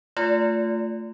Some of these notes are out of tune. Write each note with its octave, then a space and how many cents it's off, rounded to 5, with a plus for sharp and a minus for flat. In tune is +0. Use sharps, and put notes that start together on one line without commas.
A3 +15 F4 +0 D5 -35